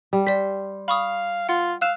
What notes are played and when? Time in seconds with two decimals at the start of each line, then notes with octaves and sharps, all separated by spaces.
0.13 G3
0.27 C5 D5 B6
0.88 F5 B5 C#6 D#6
1.49 F4 F#5
1.81 F5 E6 F#6 E7